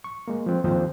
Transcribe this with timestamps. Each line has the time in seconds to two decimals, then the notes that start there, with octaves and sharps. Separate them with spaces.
0.04 C#6
0.28 G#3 A#3
0.46 F3 C4
0.64 D#2 F3 C4 C5